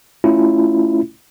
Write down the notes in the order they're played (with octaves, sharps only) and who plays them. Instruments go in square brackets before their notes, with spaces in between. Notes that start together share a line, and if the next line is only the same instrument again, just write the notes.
[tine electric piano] A3 C#4 E4 F4